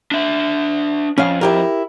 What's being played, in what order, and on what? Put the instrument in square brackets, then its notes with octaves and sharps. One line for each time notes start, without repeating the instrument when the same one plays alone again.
[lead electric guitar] D4 E5
[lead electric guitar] F2 [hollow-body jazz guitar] C#4 F5
[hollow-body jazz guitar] E4 G4 A#4